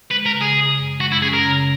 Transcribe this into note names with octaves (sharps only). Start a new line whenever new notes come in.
G#3 B4
A#4
C#3
G#4
C#3
F#2
G#3 F#4
E4
C#4 G#4
A#4
C#3